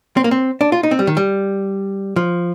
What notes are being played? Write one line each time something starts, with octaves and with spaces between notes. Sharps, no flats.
C4
A#3
C4
D4
F4
D#4
C4
G3
D#3
G3
F3